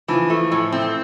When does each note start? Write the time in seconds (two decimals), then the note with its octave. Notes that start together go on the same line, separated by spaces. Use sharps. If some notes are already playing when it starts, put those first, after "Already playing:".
0.08 E3 F3
0.30 A3
0.52 A2
0.72 C4